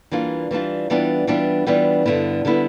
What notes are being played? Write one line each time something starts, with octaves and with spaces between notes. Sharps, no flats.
E3 G3 A#3 D4 F4
E3 G3 B3 D4 F4
E3 G3 B3 D4 F4
E3 G3 B3 D4 F4
E3 G3 B3 D4 F4
G2 D3 G3 B3 E4
D3 G3 B3 E4